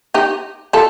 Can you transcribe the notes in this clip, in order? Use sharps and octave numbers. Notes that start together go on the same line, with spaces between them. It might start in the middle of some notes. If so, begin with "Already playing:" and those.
D#4 G4
F4 A4